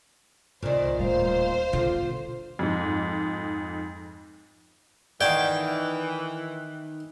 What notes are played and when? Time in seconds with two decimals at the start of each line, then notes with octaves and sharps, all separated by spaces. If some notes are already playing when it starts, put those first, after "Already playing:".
0.63 C2 A#2 D#3 C5 D5
0.99 D1 G3 C5 F5
1.73 B2 D3 F4
2.59 F2 G#2
5.21 D#3 E3 D5 F#5 G5 A5